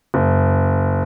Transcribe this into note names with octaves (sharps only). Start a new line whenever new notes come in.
F#1